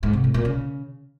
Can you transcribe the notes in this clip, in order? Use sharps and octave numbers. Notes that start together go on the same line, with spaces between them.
G#2
C3
A2
A#2
C#3